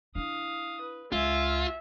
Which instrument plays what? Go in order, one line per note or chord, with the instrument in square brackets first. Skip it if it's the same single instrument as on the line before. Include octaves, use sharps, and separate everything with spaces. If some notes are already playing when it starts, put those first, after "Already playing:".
[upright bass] D4 E4 [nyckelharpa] F5 D#6
[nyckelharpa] B4
[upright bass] C#2 [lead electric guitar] F4 [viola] E5 [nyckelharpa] G#5